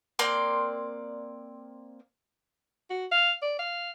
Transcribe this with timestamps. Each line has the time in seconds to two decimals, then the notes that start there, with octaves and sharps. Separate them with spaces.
0.19 A#3 C4 D5 C6
2.90 F#4
3.12 F5
3.42 D5
3.59 F5